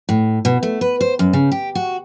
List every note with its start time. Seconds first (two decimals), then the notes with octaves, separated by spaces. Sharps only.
0.09 A2
0.45 B2
0.63 A3
0.81 B4
1.01 C5
1.19 F#2
1.33 C#3
1.52 G4
1.75 F#4